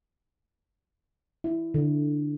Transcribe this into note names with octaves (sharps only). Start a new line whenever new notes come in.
E4
D3